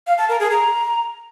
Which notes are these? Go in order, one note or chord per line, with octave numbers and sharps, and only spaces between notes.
F5
A5
A#4
G#4
A#5